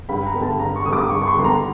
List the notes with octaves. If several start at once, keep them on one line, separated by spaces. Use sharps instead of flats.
G2 B5
A#5
D3 G3 B3
A5
G2 A#5
C#6
D3 G3 B3 D#6
D6
G2 C#6
C#6
C6
D3 G3 B3
A#5